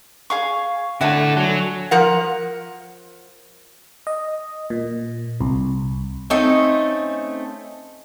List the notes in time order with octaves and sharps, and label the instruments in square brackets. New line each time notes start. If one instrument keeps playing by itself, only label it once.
[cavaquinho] G#4 F5 C#6
[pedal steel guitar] D3 [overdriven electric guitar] E4 A4 [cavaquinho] F#4 C#5 G#5
[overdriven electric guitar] F#3
[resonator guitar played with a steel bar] F3 A#4 F#5
[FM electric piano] D#5
A#2
C2
[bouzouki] A3 C4 C#4 D#4